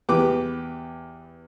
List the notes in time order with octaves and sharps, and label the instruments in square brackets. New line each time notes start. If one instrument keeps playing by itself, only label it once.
[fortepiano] E2 G4 B4 D6